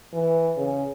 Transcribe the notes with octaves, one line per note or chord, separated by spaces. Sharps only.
E3
C#3